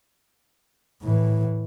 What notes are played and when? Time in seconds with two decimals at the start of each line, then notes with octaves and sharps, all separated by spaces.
1.02 A2 E3